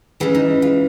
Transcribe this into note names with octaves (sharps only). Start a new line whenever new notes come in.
C#3 E3 G#3
D#4
F4